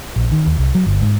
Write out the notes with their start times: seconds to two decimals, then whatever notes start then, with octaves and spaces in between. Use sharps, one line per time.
0.16 A#1
0.32 D#3
0.46 D#2
0.58 C2
0.75 F#3
0.86 G1
1.01 G#2